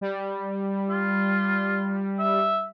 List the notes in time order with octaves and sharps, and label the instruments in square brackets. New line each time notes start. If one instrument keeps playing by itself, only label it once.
[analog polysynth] G3
[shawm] F4
E5